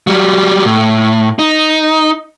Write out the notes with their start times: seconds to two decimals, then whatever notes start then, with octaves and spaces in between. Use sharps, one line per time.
0.07 F#3 G3
0.65 A2
1.39 D#4